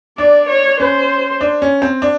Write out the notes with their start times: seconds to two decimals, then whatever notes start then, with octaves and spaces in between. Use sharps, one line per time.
0.18 D4 D5
0.49 C#5
0.80 C#4 C5
1.41 D4
1.62 C#4
1.82 C4
2.02 D4